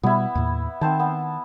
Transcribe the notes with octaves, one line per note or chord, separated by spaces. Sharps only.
B2 G3 B3 E4
D#2 A2
D#3 C4 C5 A5
B3